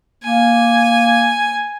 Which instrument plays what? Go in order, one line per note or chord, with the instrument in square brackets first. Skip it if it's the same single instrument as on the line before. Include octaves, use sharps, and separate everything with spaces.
[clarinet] A#3 [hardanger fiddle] G#5